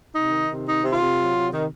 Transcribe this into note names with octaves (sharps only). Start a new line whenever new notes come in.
C3 D#4
D#3
C3
D#3 D#4
C3
F4
C3
F#3
C3
D#3